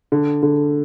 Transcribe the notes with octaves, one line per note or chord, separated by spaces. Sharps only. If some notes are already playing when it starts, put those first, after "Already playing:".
D3
D3